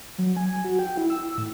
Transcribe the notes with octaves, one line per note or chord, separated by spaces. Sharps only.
F#3
G#5
F#4
G5
E4
E6
A2